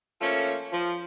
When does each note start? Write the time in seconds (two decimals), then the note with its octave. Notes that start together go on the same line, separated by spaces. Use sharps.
0.21 F3 A3 A#3 C#4
0.72 F3